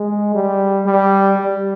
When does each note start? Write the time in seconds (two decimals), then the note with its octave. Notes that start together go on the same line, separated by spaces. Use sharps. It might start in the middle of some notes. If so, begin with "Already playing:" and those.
Already playing: G#3
0.35 G3
0.85 G3
1.37 G3